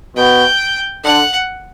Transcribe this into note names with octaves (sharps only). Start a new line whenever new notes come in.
B2 G5
D3 F#5